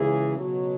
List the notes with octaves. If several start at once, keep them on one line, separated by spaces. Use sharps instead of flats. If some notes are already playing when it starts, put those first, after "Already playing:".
Already playing: C#2 C#3 E3 G#4
C#2 B2 F#3